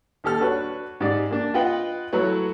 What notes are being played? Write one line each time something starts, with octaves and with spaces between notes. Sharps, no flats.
D#2 G4 A4 F6
D4 F#4 B4 C#5
G#2 G4 D5
A#3 D4
F4 B4 D#5 F#5 G5
F#3 A3 E4 B4 C#5